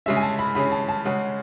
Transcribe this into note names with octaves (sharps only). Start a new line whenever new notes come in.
C#3 G#3 C#4 E5
G#5
A5
B5
C#3 G#3 C#4 B5
A5
A5
C#3 G#3 C#4 F#5